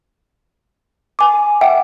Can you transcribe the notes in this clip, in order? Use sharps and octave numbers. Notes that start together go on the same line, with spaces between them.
G#5 D6
E5 F#5 G5